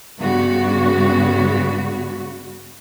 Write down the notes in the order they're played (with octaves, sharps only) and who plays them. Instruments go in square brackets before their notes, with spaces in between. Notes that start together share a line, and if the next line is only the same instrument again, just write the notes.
[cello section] G2 C#3 B3 F#4